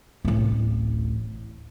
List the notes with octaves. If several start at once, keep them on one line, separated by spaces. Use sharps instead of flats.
D1 A1